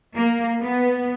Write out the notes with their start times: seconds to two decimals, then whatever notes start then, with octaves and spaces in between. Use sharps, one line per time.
0.15 A#3
0.61 B3